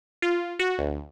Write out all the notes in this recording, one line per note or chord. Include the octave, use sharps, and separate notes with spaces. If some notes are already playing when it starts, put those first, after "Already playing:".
F4
F#4
D2